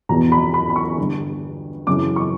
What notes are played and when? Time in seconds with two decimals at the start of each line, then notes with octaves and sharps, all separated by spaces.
0.09 E2 B2 A#5
0.32 B5
0.54 B5
0.70 B5
0.76 C#6
0.98 G2 D3
1.87 F#2 C#3 E3 D6
2.16 C#6